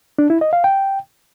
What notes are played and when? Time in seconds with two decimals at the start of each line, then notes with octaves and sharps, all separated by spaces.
0.18 D4
0.30 E4
0.41 D#5
0.53 F5
0.64 G5